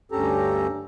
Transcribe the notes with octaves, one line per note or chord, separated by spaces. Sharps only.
D2 G2 C#4 G4 A4 A#5